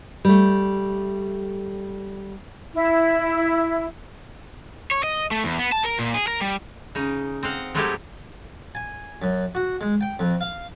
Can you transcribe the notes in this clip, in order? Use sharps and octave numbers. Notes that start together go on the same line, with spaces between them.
G3 A3
E4
C#5
D#5
A3
E2
B3
A5
A#4
A#2
G#4
A#4
G3
C#3 D#4
C4 D#5 F5 F#5
F#3 G#3 A3 D#4 E4 G4
G#5
F#2
F#4
G#3
G5
F2
F5